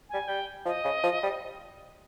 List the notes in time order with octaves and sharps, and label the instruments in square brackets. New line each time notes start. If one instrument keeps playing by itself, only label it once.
[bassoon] G3 [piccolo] G#5
[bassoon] G3 [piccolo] G5
[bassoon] F3 [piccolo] D#5
[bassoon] C#3
F3
G3